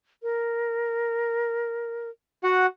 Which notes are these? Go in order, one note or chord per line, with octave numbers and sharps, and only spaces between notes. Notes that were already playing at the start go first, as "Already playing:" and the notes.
A#4
F#4 F#5